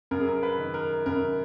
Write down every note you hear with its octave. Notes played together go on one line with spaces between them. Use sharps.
F#2 A#4
G#4
A#4
B4
D#3
A#4
F#2 A#4